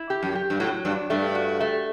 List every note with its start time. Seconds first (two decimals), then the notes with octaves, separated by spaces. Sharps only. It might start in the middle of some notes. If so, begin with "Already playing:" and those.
Already playing: E4
0.10 G4
0.23 F#2
0.35 G4
0.50 G2
0.60 A2 F#3
0.85 G2 D4
1.10 G2 A3
1.35 F#4
1.60 A3